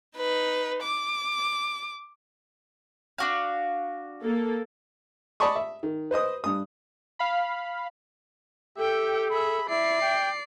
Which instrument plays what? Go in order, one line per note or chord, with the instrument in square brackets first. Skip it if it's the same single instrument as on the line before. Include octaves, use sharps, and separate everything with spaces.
[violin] D#4 B4
D6
[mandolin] D4 F#4 F5
[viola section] A#3 A4
[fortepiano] D5 D#5 A5 B5 C#6 D#6
E5
D#3
B4 C5 D#5 D#6
G2 D#6
[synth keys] F5 B5
[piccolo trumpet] G4 [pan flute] A4 [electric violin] E5 G5
[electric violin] G#4 E5 [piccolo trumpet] B5
[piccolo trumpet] E4 [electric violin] D5 C7 [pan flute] E5
[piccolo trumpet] G5